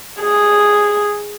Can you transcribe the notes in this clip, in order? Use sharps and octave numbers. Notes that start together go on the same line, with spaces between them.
G#4